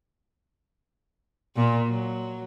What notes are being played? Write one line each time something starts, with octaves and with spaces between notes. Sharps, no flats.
A#2
F#3